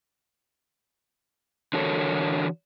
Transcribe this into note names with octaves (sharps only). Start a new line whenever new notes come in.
D3 E3 F#4 A4 A#4 C#5